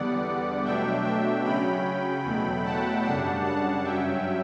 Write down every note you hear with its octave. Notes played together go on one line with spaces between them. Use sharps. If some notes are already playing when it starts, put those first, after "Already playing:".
Already playing: E2 D3 G3 B3 D5 F#5
B2 F#3 A3 D4 E5 G5
E5 G5
C#3 F#3 C#4 G5 B5
E2 B2 F#3 A3
F#5 A5
F#2 C#3 G3 D4 F#5 A5
F#5 A5
G2 F#3 C#4 E5 G5